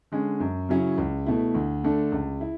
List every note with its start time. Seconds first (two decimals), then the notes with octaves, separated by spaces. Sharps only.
0.12 D3 G#3 C#4
0.40 F#2
0.69 C#3 F#3 C#4 E4
0.98 C#2
1.26 B2 A3 E4
1.54 D2
1.84 D3 A3 D4
2.12 C#2
2.41 E4